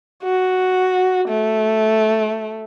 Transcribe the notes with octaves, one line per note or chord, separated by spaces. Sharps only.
F#4
A3